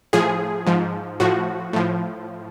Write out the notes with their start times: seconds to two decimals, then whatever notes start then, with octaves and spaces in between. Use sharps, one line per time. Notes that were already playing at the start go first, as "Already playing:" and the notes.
0.13 A2 F3 G#4
0.67 G#2 F3
1.20 A2 F3 F#4
1.73 A2 F3